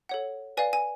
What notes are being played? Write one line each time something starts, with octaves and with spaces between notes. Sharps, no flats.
A4 C#5 F#5
B4 D5 F5 G#5
G#5